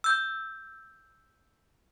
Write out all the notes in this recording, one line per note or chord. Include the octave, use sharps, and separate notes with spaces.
E6 G6